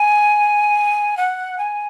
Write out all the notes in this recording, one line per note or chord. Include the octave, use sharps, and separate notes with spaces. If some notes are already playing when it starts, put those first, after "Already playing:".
Already playing: G#5
F#5
G#5